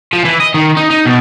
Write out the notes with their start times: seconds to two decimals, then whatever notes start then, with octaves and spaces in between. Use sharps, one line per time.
0.13 F3
0.25 E3
0.40 D#5
0.54 D#3
0.77 D#4
0.90 D#4
1.05 B2